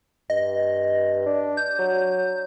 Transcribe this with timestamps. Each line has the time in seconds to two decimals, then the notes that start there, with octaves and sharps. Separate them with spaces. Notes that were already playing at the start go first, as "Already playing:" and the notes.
0.30 G2 D#5
1.26 D4
1.57 G6
1.79 F#3